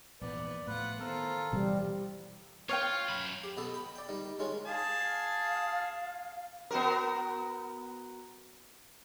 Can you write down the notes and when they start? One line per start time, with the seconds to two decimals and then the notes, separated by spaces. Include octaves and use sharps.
0.21 A#1 E2 G#2 B3 D5
0.67 A2 F3 F4 B4 F#5
0.99 D#3 B3 F4 A4 A#4 C5
1.51 D2 B2 E3 G3
2.69 F4 C#5 F5 G5
3.09 F#2 B5
3.43 G4
3.57 B2 B3 A4 D#6
3.74 G5 B5
3.96 D5 G5
4.08 D#3 G3
4.39 D#3 G#3 C#4 F4
4.66 G#4 F5 A5
6.71 B3 F#4 A#4